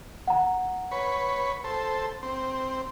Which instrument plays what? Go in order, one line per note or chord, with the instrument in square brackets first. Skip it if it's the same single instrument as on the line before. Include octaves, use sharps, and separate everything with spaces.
[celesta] F#5 A#5
[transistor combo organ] B4 C#5
A4 C5
C4